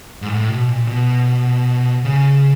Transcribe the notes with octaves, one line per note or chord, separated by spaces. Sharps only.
G#2
A2
B2
A#2
B2
C#3